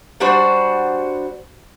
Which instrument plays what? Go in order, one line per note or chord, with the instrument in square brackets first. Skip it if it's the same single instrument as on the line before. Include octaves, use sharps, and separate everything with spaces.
[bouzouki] G3 D4 F#4 C5